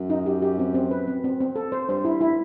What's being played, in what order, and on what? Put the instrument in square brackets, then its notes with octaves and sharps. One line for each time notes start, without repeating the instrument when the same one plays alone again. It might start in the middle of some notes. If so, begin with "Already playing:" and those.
Already playing: [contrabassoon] F#2
[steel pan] D#4
G4
G4
C4
C4
B4
C4
C4
C4
A4
C5
[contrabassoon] G2 [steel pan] C5
[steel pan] E4
E4